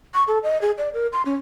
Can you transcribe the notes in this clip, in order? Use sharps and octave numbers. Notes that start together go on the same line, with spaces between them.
C#6
A4
D#5
G#4
D5
A#4
C6
C#4